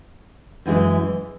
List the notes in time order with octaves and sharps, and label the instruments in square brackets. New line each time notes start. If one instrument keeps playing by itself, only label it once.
[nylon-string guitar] F#2 E3 G#3